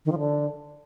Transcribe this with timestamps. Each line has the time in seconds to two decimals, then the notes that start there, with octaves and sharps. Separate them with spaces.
0.05 D#3
0.12 F3
0.19 D3